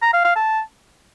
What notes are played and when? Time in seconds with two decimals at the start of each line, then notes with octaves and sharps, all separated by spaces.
0.02 A#5
0.14 F5
0.25 F5
0.36 A5